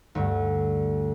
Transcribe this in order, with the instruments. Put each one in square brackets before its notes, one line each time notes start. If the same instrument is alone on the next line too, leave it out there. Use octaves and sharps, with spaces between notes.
[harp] D2 G2